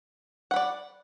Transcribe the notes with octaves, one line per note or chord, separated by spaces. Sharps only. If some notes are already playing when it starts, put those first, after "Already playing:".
D5 F#5 B5